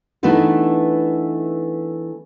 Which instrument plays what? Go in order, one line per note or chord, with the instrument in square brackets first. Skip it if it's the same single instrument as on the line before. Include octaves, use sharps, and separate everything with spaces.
[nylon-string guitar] E3 A3 B3 D4 D#4 A4